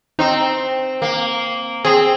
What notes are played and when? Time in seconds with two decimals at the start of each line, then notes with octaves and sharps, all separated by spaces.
0.19 C4 D#4
1.02 A#3
1.85 C4 G#4